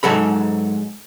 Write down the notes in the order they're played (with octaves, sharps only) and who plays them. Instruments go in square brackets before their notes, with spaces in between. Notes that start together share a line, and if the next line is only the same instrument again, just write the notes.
[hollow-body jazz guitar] G#2 F#3 A4 B5